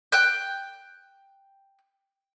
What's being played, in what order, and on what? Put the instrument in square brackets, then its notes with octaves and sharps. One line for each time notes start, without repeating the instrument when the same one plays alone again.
[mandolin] G5 F#6 G6